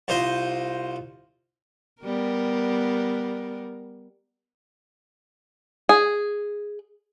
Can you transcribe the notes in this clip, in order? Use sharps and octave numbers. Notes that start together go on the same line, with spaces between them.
C2 F4 C5 D#5
G3 B3 A#4
G#4